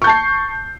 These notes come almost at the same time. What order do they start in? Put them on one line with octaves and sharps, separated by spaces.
C#6 G6 A5 C7